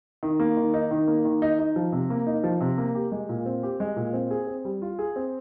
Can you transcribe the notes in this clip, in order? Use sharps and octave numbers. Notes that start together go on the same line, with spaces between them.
D#3
A#3
D#3
D#4
D#3
A#3
D#3
D#4
D#4
F3
C3
A#3
D#4
F3
C3
A#3
G4
G#3
A#2
C4
G4
G#3
A#2
C4
G#4
C4
G3
F4
G#4
C4